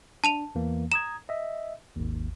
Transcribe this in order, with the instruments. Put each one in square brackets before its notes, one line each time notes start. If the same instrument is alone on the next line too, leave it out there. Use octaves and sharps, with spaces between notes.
[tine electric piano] D4 [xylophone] A5 D#7 F7
[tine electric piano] E2 E3 A#3
[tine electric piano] A#5 D#6 G#6 [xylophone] E7
[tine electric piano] D#5 E5
G#1 D#2